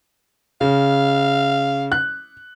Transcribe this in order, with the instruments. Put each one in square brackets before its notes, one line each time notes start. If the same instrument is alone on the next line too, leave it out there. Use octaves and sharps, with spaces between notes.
[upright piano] C#3 [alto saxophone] F5
[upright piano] F#6